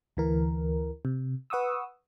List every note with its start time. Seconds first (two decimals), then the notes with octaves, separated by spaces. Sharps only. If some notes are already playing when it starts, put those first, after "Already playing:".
0.17 D2 E3 A#4
1.05 C3
1.50 B4 F#5 C#6 D#6 E6